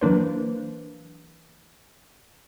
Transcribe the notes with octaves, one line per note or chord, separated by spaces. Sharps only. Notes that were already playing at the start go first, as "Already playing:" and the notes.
E3 F#3 A#3 D4 B4 C5